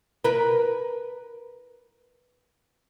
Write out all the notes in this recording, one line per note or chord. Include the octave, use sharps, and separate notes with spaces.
A#4 B4